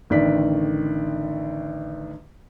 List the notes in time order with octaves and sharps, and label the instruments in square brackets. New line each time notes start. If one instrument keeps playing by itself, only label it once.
[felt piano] A1 D3 D#3 D5 B6